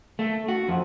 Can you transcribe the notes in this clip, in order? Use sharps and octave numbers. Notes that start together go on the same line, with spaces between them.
A3
F#4
F2